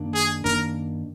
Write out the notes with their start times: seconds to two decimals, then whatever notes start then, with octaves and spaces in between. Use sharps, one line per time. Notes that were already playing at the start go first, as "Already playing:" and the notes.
Already playing: F#2 D#3 A#3 D4
0.14 G#4
0.44 F#2 D#3 A#3 D4 A#4